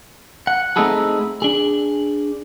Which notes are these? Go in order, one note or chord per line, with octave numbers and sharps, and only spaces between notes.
F#5
A3 C4 D#4 E4 G#4 A4
D4 G#4